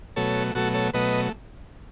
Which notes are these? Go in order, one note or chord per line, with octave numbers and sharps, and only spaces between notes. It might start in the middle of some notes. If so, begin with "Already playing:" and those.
B2 F#3 A3 A4 C#5
B2 F#3 A3 F#4 A4
A4 C#5
B2 F#3 A3 B4 D#5